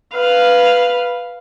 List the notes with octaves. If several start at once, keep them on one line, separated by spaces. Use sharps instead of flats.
B4 F5